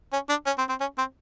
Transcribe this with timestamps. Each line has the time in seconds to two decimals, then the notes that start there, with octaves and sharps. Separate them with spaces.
0.13 C#4
0.29 D4
0.46 C#4
0.58 C4
0.69 C4
0.80 C#4
0.98 C4